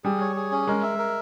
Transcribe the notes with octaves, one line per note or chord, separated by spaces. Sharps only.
G3 G#4
C#5
G#4
C#4
G#3 A#4
E5
A#4